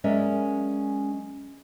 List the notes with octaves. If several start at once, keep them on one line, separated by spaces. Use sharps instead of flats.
F#3 G#3 C#4 A#4 D5 E5